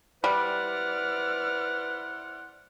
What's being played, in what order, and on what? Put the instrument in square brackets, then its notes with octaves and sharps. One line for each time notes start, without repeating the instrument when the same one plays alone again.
[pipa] G3 [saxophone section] E4 C5 F#5 [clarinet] B4 [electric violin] D5 F6